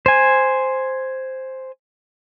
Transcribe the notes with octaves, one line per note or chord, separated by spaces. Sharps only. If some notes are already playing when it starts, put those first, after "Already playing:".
C5 G#5